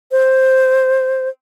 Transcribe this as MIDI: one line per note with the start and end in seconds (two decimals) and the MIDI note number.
0.12 1.29 72